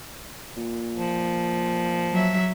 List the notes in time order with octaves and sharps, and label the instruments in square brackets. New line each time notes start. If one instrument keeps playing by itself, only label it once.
[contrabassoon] A#2
[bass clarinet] F3
[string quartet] F#3 E5